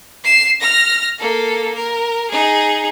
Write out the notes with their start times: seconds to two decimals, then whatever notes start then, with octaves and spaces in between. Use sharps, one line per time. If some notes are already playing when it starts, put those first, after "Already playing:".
0.24 C7 E7
0.61 F6 A#6
1.19 A#3 A4
1.75 A#4
2.31 D#4 G#4